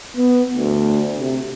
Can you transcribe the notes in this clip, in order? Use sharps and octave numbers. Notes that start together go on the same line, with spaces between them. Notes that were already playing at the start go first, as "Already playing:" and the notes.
B3
D2
C3